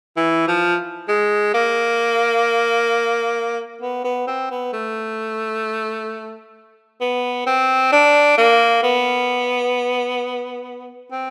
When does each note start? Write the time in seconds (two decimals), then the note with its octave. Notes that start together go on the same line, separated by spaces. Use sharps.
0.17 E3
0.48 F3
1.08 G#3
1.54 A#3
3.82 B3
4.04 B3
4.27 C4
4.50 B3
4.73 A3
7.01 B3
7.47 C4
7.92 D4
8.38 A#3
8.83 B3
11.11 C4